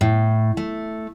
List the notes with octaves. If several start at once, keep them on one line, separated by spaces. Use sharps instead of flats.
A2
A3